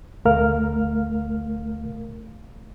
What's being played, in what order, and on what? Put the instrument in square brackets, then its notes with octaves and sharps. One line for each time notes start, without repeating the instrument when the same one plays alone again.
[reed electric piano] D2 A3 A#4 F5 F6